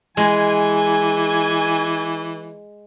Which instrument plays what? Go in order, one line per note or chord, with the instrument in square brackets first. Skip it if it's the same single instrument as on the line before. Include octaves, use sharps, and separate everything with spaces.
[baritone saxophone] E3 [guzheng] G#3 [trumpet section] G#5